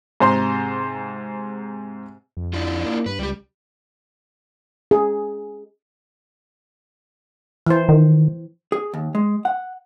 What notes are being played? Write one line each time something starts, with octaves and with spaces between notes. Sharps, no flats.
G#2 C3 C5 A#5 C6
F2
D4 E4 F4
A#3
G2 B4
C#2 G3 G4
G#4
E3 C5
D#3
G#4
D#2
G#3
F#5